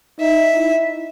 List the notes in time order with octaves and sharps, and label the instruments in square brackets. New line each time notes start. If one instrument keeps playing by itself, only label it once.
[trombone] D#4 [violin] E5
[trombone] E4